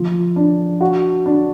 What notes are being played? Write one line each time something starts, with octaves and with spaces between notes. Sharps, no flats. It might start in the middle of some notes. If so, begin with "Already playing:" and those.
Already playing: F3
D4
F#4
D4